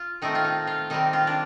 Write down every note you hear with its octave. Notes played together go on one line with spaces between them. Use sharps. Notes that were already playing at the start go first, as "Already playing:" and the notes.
Already playing: F4
D#3 A3 C4 D#4
F4
D#4
F4
D#3 G3 C4 D#4
F4
D4